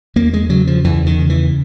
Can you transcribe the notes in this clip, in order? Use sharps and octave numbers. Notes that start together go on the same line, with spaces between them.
E2 A#3
G#3
C#3 F#3
F3
E2 E3
D#3
C#3
E3